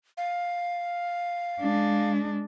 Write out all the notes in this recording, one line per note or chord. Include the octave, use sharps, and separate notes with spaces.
F5
G#3 D4